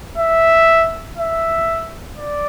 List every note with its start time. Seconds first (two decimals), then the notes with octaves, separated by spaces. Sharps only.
0.18 E5
1.18 E5
2.18 D5